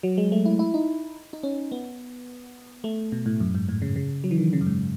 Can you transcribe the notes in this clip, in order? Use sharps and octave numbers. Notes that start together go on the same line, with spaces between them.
F#3
G#3
A3
E4
E4
D#4
D#4
C#4
B3
A3
B2
A2
F#2
G#2
A2
C#3
C#3
F#3
E3
D#3
C#3
F#2
G#2